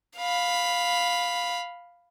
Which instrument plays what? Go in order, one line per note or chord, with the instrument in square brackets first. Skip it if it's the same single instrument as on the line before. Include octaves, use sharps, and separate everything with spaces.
[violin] F5 B5